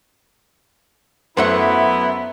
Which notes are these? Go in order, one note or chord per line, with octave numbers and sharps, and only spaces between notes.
F#2 A3 B3 E4 C5 E5 F#5 C#6